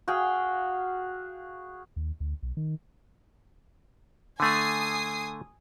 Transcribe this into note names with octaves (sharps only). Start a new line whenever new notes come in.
F#4 G#4 F5 G5
D#2
D2
B1
D#3
D3 A3 G#5 D#6 C7